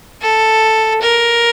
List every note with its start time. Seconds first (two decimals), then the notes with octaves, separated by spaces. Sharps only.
0.22 A4
1.01 A#4